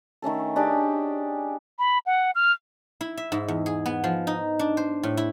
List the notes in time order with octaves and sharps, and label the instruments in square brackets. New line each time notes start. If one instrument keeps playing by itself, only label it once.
[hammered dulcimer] D#3 A3 C#4 A4
C#4 D4 G4 G#4
[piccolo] B5
F#5
F6
[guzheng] E4
E5
G#2
E2
G#4
B3
F3
D#4
D4
C5
A2
E4